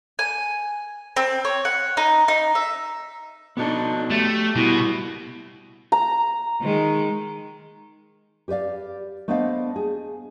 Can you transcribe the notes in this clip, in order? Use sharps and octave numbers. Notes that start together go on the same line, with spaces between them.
G#5
C4
C#5
F#5
D#4
D#4
E5
B3 D4 D#4 F#4 A4
A3 G4
B2 G3 E4
A#5
D#3 G#3
G4 B4 C5 D5 F5
A3 B3 D4 C5 D#5 F5
G#4